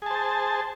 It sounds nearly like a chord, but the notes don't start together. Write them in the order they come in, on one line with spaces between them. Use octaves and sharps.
G#4 A5 C5